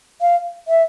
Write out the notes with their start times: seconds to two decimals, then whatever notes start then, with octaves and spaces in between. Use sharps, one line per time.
0.21 F5
0.68 E5